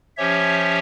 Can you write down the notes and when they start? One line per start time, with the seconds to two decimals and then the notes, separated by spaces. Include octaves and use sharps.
0.17 F3 C#4 G4 C#5 E5